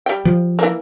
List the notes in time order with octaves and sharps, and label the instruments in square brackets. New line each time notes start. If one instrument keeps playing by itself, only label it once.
[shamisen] G3 G5
[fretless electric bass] F3
[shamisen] E3 A#3